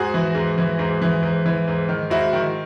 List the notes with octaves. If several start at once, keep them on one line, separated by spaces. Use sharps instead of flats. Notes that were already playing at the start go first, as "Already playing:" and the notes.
Already playing: G#2 F#4 G#4
E3
G#2
E3
G#2
E3
G#2
E3
G#2
D#3
G#2 E4 F#4
D#3